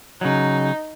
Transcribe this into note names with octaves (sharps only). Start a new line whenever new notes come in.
C#3 F#3 D#4